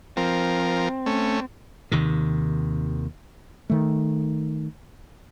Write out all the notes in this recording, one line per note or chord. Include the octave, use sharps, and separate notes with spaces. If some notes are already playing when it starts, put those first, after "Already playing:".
F3 C4 A#4
A3 C#4
D#2 C3 D#3
D#3 A3